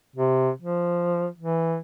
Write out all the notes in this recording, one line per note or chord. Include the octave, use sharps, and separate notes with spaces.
C3
F3
E3